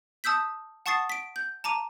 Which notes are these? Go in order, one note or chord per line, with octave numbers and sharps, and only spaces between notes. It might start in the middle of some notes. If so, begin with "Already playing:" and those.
A5 D#6 E6 G6 B6
F#5 A5 C#6 D#6 A6 C7
B6 D7
G6
A5 A#5 D6 D#7